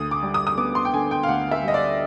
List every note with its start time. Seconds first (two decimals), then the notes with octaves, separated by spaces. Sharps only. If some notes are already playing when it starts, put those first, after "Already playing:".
Already playing: D2 D#6
0.11 D6
0.23 G3
0.34 D#6
0.47 D#6
0.58 B3 D6
0.75 C6
0.85 G5
0.93 D3 G#5
1.11 G5
1.23 F5
1.28 D2 F#5
1.51 E5
1.63 G3 D#5
1.74 D5